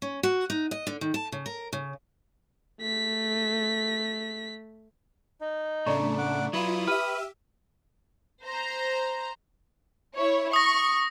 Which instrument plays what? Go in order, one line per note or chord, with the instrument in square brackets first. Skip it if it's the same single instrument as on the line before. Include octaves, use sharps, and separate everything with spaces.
[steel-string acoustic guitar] C#4
F#4
D#4
D#5
D3
D#3
A5
C#3
A#4
C#3
[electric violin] A3 B6
[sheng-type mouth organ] D#4
[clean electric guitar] A2 C#3 [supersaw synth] A3 D4 [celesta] D5 A#5 C#6
[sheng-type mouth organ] F#5 D6
[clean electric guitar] F#3 B4 [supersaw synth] E4 F4 [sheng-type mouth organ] D#6
[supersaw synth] G4 E5 [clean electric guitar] B4 [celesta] F6 D#7
[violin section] C5 A#5
E4 C#5
[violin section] C#6 [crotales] D#6 A#6